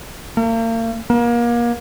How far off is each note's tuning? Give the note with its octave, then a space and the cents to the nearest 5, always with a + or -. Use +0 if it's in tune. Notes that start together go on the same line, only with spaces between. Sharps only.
A#3 -40
A#3 +30